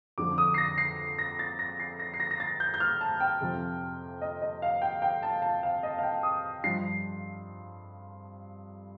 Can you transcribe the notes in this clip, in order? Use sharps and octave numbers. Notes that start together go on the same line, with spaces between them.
F2 D3 F3 D6
D#6
C7
A#6
C7
A#6
A6
A#6
C7
A#6
C7
A#6
A#6
A6
G6
G6
F6
A5
G5
F2 C3 F3
D#5
D#5
F5
G5
G5
A5
A5
F5
D#5
F5
G5
D#6
G2 F3 C7